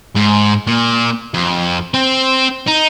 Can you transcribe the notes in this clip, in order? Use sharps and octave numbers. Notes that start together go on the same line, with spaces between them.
G#2
A#2
F2
C4
D#4